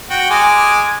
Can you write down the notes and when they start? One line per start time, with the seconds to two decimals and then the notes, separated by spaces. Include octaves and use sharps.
0.10 F#4 G5
0.30 G#3 G#5 D6